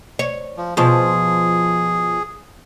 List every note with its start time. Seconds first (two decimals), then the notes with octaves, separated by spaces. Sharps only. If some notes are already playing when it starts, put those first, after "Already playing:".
0.19 C#5
0.57 F3
0.77 B2 F3 G#4